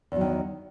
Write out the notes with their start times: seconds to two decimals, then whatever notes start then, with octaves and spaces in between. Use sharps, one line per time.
0.12 E2
0.16 F#3
0.21 D#3